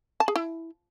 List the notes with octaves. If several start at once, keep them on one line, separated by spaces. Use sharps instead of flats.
A5
G#4
E4